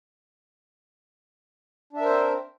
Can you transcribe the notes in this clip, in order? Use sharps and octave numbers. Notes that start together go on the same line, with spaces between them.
C4 D4 A#4 C5 E5